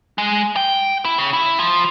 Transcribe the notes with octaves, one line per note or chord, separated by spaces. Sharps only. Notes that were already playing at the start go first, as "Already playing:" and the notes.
G#3
G5
E4
C#3
E4
F3